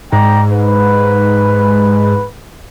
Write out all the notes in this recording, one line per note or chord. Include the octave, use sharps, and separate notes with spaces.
G#2 D5 G5 A#5
B4